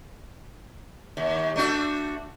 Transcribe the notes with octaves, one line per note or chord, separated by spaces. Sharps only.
D#2
A3 D4 F#4